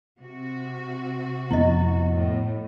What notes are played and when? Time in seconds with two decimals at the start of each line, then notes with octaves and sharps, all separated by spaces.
0.19 C3 F#4
1.51 F2 F3 B3 E4 D#5
2.12 A2